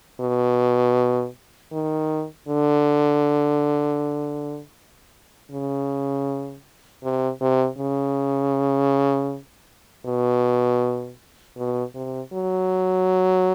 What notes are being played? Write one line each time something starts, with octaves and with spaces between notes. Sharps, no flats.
B2
D#3
D3
C#3
C3
C3
C#3
B2
B2
C3
F#3